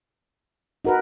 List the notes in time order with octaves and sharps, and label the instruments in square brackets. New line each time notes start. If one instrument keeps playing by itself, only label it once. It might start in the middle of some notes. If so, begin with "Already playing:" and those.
[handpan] D#4 A#4 B4 [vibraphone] F#4 F#5